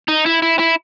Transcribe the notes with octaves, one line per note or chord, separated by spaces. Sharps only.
D#4
E4
E4
E4